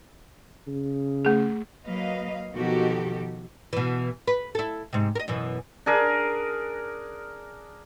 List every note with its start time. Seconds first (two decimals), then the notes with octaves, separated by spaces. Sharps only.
0.67 C#3
1.25 A3 G#4
1.86 F#3 A#3 B4 D#5 F5
2.54 B2 D#3 F3 F#4 G4 A4
3.73 B2 E3
4.27 B4
4.55 E4 A4
4.93 G#2 C3
5.15 A#4 D#5
5.28 F#2 B2 E3
5.86 D4 G#4 A#4